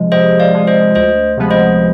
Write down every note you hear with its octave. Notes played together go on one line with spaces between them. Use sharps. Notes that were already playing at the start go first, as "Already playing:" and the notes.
Already playing: C3 F3 G#3
C3 C5 D#5
D5 F5
F3 G#3
C5 D#5
D2 C5 D#5
C3 F3 G#3 B3
C5 D#5